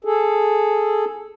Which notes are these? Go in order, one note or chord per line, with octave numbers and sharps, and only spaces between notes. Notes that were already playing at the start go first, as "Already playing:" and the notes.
G#4 A4